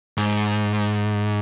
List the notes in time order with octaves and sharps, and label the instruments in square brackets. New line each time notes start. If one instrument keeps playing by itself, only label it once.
[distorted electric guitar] G#2